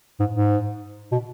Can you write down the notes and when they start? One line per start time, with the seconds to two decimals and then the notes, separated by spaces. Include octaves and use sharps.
0.20 G#2
0.35 G#2
1.12 B2